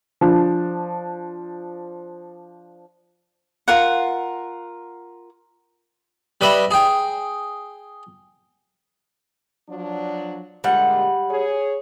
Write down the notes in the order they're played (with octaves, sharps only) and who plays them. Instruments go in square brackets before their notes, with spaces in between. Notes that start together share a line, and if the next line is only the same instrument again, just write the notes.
[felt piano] F3 D4
[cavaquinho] F4 A#4 F#5
[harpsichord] G3 B4 D#5 E5
G#4 G5
[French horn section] F3 F#3 D4
[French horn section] A#2 D3 G#3 [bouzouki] G3 F#5
[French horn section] G#4 C#5